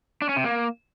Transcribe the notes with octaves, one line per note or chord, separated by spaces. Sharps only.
D4
C#4
C3
A#3